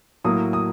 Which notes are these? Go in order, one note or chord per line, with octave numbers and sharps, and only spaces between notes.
A2 F#3 A#3 D#6
D#6